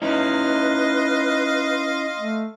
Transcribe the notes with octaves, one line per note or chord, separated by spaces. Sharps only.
C#4 D#4 E4 B4 D#5 F5 C6
A3